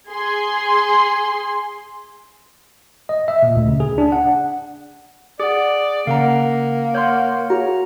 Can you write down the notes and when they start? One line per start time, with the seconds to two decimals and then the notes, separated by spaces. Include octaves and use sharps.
0.11 G#4 C6
3.09 D#5
3.28 E5
3.43 A#2
3.56 D2
3.68 C#3
3.80 G#4
3.98 D4
4.12 F#5
5.40 G#4 D5 F#5 D6
6.07 C#3 A#3 F5 F#5 A#5
6.94 C#5 F#5 C6 F6 G6
7.50 F#4 G#4 C#5 A#5